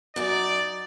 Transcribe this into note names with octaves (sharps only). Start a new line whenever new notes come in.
F#2 D#4 D5